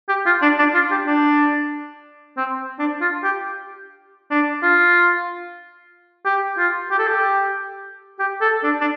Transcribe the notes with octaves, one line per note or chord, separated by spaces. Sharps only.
G4
F4
D4
D4
F4
G4
D4
C4
D4
F4
G4
D4
F4
G4
F4
G4
A4
G4
G4
A4
D4
D4